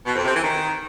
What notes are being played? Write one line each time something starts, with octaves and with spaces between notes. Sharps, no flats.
B2
F2
C3
E3
D#3